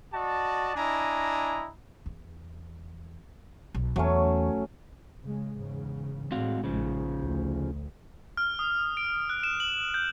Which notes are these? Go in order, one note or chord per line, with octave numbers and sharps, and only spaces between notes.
F#4 D5 D#5 A5
D4 E4 D#5 G#5 A#5
E2
B1
E2 F#3 A3 C#4
C#3 G#3
E2 G#2 C#3
A2 G#3 C4 F#4 F5
A#1 C#3 F3
D2
F6
D#6
D7
F#6
E7
F#7
G6